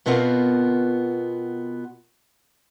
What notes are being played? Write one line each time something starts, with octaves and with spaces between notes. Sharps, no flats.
B2 B3 C4 F4 A#4 F#5